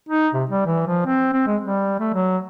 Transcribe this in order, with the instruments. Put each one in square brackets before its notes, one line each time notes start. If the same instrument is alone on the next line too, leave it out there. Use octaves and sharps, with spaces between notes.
[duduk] D#4
C3
G3
E3
F3
C4
C4
G#3
G3
A3
F#3